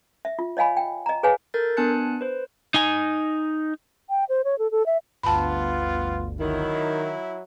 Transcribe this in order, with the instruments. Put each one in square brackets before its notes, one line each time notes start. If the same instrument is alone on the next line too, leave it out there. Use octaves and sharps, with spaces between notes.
[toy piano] E5
F4
C#5 D#5 F5 G#5 B5
G5
D#5 A#5
G#4 B4 C#5 F5 G#5
[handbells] A4 A#4 G6 A6
B3 D4 G#5 A5 F#6 C#7
B4 C5
[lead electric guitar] D#4 G#5
[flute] G5
C5
C#5
A4
A4
E5
[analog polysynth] G1 D2 [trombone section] B3 F4 [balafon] A5 B5
[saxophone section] D#3 [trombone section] F#3 E4